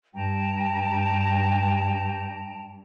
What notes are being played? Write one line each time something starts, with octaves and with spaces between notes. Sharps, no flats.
G2 G5 A5 A#5